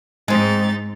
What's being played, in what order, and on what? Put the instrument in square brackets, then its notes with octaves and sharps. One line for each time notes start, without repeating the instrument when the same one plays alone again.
[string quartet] G#2 D#4 A6 [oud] G#3 C4